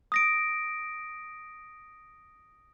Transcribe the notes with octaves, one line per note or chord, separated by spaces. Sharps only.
D#6 A#6 D7